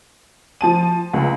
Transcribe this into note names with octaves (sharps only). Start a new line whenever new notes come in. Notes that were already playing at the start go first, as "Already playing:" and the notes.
F3 A5 D#7
C#2